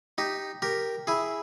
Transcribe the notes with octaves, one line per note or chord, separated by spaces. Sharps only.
D#4 G4
G4 A#4
E4 G#4